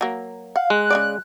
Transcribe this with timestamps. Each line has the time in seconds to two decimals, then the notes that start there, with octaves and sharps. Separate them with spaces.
0.01 F#3 A#3
0.56 F5 F#5
0.70 G#3 F#6
0.90 C#3 A#3 D5